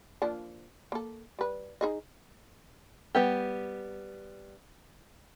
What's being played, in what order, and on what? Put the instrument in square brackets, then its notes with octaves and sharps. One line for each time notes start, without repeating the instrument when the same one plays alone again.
[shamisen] F3 A#3 D4
A#3 A4
G3 B4
D#4 G#4 D#5
[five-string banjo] G3 B3 G4